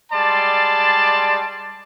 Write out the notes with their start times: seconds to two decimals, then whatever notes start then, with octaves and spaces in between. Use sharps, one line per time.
0.12 G3 G#3 D5 A5 C6